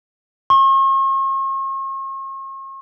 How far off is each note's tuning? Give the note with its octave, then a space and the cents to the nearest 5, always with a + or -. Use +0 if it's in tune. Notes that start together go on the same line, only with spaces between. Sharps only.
C#6 -45